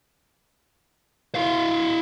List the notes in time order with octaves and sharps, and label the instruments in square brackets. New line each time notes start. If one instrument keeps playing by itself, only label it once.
[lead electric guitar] E4 F5